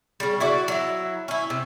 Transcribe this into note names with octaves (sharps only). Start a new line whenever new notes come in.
C#3 G3
E4 F#4 D5
F#3 E4
C#4 E4
C3